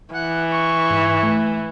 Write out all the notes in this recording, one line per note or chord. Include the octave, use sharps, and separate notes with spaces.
E3 F#5
C#6
G#2
A3